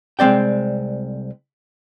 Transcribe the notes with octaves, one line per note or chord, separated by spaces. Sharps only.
C2 G#3 C4 D5 G5